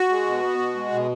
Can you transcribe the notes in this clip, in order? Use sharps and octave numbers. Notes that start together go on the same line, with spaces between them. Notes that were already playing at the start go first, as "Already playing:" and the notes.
Already playing: F#4
G#3
B2
B3
B2
G#3
B2